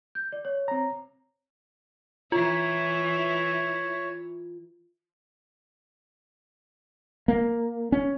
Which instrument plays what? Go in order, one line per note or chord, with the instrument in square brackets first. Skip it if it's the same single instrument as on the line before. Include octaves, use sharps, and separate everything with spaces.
[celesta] G6
D5
C#5
[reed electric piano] C4 A#5
[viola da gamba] E3 E4 [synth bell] F4 [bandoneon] C#5
[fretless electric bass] A#3
C#4